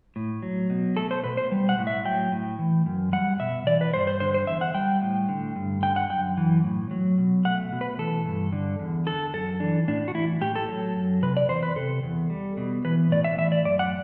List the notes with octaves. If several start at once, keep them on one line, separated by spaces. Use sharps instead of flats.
A2
F#3
B2
A3 A4
C5
B2 B4
C5
G3
F#5
A2
E5
F#3 G5
A2
E3
F#2
G3 F#5
B2 E5
E3 D5
B4
G2 C5
C5
D3 C5
C5
E2 E5
F#5
G3 G5
A2
D3
G2
D3 G5
F#5
F#2 G5
E3
A2
F#3
B2
A3 F#5
B2
B4
E3 A4
G2
D3
E2
D3 A4
F#2 A4
E3 D4
A2 D4
F#4
E3 E4
A2 G4
A4
F#3
F#2
C3 B4
D5
E2 C5
B4
C3 A4
E2
G3
B2
E3 B4
A2 D5
E5
E3 E5
D5
F#2 D5
F#5